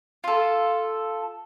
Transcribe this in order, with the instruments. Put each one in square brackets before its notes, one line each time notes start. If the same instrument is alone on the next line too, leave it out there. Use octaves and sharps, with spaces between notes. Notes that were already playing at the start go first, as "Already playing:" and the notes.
[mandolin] F4 A4